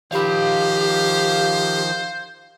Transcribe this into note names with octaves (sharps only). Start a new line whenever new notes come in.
D#3 F3 G4 C5 F5 B5